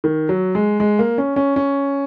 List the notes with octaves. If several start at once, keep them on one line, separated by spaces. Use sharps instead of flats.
D#3
F#3
G#3
G#3
A#3
C#4
C#4
C#4